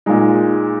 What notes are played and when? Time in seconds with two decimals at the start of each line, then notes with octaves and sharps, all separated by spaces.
0.06 A#2 G#3 D#4